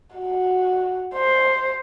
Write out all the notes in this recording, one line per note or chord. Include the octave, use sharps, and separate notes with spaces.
F#4
C5